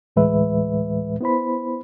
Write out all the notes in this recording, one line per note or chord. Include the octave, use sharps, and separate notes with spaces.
D2 A2 E3 G#3 B4 E5
B3 E4 C5 B5